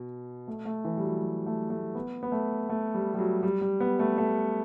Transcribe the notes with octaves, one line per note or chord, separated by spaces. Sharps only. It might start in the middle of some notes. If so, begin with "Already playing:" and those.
Already playing: B2
A3
A3
E3
G3
F#3
G3
A3
A3
B3
B3
A3
A3
G3
G3
F#3
G3
G3
B3
A3
A3